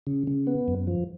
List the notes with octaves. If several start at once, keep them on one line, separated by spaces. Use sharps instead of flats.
C#3
C#3
B3
F#2
F3